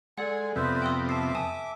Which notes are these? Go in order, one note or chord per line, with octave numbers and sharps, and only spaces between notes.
G#3 A4 D5 F#5 G#5
F2 C3 B3 B4 C5 E5
G5 C6 D#6
E5 A5 D6 C7
G#5 A5 D#6